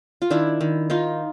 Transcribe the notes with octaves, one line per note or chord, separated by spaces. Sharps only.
F4
D#3 D4 E4
D#3
D#3 D#4 F4